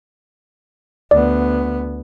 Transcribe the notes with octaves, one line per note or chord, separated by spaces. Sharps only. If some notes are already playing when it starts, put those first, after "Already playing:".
D2 B3 D5